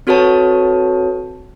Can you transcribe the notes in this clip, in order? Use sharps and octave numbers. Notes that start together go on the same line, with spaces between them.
C4 F#4 A4 B4 C#5 A5